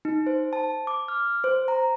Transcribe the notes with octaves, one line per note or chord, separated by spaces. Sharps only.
D#4
C5
A5
D6
F6
C5
A#5